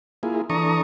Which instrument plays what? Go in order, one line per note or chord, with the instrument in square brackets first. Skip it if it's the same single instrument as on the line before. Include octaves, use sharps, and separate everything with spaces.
[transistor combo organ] A#3 E4 F4 G#4
E3 D4 A4 A#5 C#6 D#6